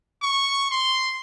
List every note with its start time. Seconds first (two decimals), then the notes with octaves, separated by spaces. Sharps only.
0.22 C#6
0.71 C6